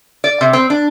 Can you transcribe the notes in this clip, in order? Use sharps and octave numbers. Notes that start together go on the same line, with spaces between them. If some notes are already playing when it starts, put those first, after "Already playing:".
D5
C3
C4
D4